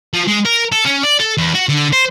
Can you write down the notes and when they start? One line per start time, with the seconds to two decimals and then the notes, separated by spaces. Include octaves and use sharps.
0.13 F3
0.27 G#3
0.45 A#4
0.72 A4
0.85 C#4
1.04 D5
1.20 A4
1.38 E2
1.55 F#4
1.69 D3
1.93 C5